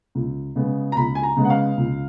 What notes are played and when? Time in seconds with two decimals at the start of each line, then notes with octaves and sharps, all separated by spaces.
0.15 C#2
0.56 C#3 G#3 B3
0.92 A#5
0.96 C#2 B5
1.15 G#5
1.23 A#5
1.37 C#3 G#3 B3
1.45 F#5
1.50 F5
1.77 C#2